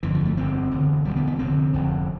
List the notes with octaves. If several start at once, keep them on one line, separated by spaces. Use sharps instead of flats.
G1 F2 D3 E3
F3
A3
G1 F2 D3 C4
E1 D2 D3
E1 D2 D3 G3
B3
B3
F1 F2 D3 C4
F1 F2 D3